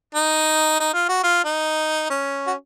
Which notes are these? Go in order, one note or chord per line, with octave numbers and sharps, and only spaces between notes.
D#4
D#4
F4
F#4
F4
D#4
C#4
F#4